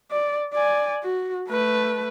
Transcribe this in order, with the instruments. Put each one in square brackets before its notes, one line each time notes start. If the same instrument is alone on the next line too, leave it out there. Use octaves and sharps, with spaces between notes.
[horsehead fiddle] D5
D5 G#5
F#4
A3 B4